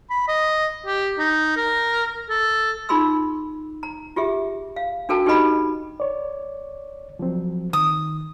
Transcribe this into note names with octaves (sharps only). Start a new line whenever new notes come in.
B5
D#5
G4
D#4
A#4
A4
D#4 F4 G#4 B5 C6 E6
A#5
F4 G4 G#4 E5
F5
D4 F#4 A4 A#4 G5 A5
D#4 G4 A4 B4 D#5 B5
C#5 D5
F3 F#3 C4
D#3 D#6